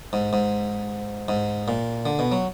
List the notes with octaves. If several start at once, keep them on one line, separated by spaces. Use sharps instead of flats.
G#2
G#2
G#2
A#2
D3
B2
F#3